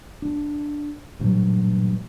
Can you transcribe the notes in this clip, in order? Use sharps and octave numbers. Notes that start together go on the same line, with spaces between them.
D4
A1 G2 A#2 F#3